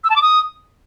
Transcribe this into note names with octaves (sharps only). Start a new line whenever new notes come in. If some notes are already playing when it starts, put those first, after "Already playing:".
E6
A5
D6
D#6